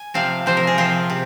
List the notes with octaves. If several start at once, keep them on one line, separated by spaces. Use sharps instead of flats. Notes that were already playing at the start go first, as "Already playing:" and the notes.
Already playing: G#5
C3 F3 C4 F5
C3 F3 C4 C5
A#4
G#4
C3 F3 C4 F4
C3